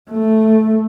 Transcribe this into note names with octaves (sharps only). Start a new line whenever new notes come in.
A3